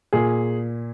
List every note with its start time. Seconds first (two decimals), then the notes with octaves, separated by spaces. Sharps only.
0.13 A#2 G#4